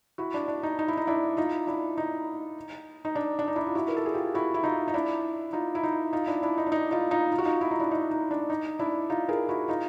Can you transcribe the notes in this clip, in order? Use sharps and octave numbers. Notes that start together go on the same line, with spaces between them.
E4 F#4
D4
D4
D#4
D#4
E4
D#4
D4 E4
D#4 F4
D4 E4
D#4
D#4
D4
D4
D#4
D4 E4
F4
E4 F#4
A#4
A4
G#4
F4 G4
E4 F#4
E4
D#4 F4
D#4
D4 E4
D#4 F4
E4
D#4
D#4 F4
D4 E4
D4 E4
D#4
D4
D#4
D#4 F4
D#4 F4
F4
F#4
D#4 F4
E4
D#4
D4 E4
D#4
D#4
D4
D#4
D4 E4
D#4 F4
G#4 A#4
E4 F#4
D#4 F4